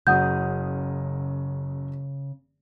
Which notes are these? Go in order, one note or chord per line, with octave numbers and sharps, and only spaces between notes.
F#1 C#3 F#3 F#5 D#6 G6